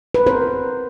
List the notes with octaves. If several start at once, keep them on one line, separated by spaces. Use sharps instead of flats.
B4
C4 A#4 C5